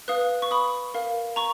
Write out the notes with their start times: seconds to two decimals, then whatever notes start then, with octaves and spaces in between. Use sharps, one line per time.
0.08 B4 F5 D#6 F#6
0.42 C#6
0.51 B5 D#6
0.94 A#4 F5
1.36 A#5 C#6